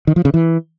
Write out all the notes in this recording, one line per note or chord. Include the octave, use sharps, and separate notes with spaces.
D#3
F3
C#3
E3